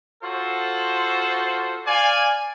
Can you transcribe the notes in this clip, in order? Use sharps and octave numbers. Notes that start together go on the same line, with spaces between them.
F4 F#4 A4 C5
D5 F5 G#5